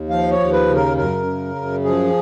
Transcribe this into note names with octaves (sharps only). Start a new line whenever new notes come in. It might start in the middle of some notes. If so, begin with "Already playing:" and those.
Already playing: D#2
F3 F5
C#5
D#2
B4
C#3
A#4
F#2 A#4
C#3
F#2
F3 G#4